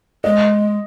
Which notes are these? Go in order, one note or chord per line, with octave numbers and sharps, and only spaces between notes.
G#3 D#5